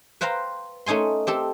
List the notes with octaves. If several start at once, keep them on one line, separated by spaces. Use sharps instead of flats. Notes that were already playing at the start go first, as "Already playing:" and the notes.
B4 C5 F5 G5 A#5
A3 C#4 D#4 G#5 C6
C4 G4 A4